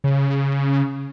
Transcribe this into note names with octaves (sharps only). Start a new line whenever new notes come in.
C#3